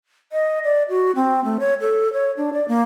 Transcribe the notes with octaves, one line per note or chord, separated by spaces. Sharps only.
D#5
D5
F#4
C4
A3
C#5
A4
C#5
D4
D5
A#3